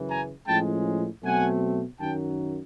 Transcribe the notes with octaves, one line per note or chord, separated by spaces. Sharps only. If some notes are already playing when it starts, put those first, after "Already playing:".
Already playing: F#2 C#3 E3
G#5 A#5
A2 F3 G#3 C#4 G5 A5
B2 F#3 A3 C4 F#5 G#5
F#2 D#3 F#3 G5 A5